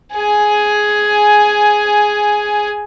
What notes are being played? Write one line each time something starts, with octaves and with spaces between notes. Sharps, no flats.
G#4 G#5